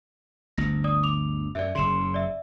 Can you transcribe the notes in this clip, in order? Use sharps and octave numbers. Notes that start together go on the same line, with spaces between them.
G1 D2 A#6
D5 D#6
D6 F7
F#2 D5 E5
F#1 C#3 C6 E7
D5 E5